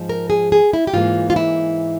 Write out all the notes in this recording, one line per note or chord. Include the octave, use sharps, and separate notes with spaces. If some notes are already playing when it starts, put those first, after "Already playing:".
Already playing: G#2 F3 G#3
A#4
G#4
G#4
E4
G4
G#2 E3 A#3 F4
F4
E4